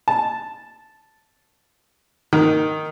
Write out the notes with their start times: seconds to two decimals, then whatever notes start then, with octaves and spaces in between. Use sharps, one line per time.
0.08 A5
2.33 D#3